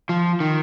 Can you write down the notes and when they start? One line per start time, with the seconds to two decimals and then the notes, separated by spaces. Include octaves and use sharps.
0.09 F3
0.40 D#3